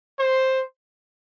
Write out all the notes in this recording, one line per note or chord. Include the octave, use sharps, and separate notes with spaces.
C5